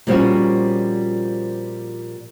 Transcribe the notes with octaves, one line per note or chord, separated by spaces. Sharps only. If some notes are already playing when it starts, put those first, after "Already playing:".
A#2 F3 G3 C4 C#4 F#4